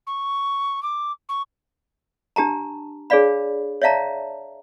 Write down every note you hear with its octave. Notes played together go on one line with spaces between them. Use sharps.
C#6
D6
C#6
D4 G4 A5 A#5
D4 G#4 C#5 D5 F5 B5
C#5 D5 E5 F5 A5 A#5